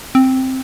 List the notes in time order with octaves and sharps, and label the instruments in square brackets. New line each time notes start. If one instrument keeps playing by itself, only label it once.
[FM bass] C4